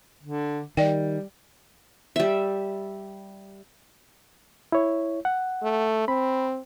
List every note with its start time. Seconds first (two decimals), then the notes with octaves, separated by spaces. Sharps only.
0.23 D3
0.77 D#3 G3 D5 G5
2.16 G3 E5
4.72 E4 C#5
5.25 F#5
5.63 A3
6.08 C4 B5